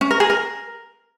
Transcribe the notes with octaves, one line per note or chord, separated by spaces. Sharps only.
C#4
A#4
G#4
A#4